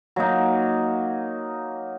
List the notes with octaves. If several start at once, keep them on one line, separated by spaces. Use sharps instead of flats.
F#3 A#3 D#4